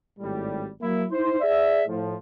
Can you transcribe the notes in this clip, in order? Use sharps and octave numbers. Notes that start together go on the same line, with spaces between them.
G#1 A2 G3
F#3 A#3 E4
D#4 E4 C5
G#4 D5 E5
A2 F3